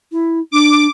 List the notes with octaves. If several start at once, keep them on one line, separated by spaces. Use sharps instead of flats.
E4
D4 D6